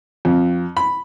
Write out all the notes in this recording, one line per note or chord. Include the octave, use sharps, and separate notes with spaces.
F2
B5